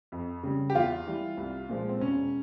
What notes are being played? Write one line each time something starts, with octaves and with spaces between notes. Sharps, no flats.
F2
C#3 G3
G4
E2 F4
E3 G3
C2
A#2 F3 G#3
C4
E1 C#4